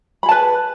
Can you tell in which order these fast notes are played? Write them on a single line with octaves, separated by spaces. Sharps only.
B5 G#4 A5 B4